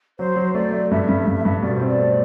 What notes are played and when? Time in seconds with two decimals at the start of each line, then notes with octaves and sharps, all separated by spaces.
0.19 F#3 C5
0.36 F#3
0.54 A3 D5
0.72 A3
0.91 G2 E5
1.08 G2
1.27 G2
1.45 G2
1.62 B2 D5
1.75 C5
1.81 C4
1.87 D5
1.99 A3